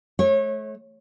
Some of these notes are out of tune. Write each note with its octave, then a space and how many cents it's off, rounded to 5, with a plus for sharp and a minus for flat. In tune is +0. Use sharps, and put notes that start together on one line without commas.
A3 -35 C#5 -30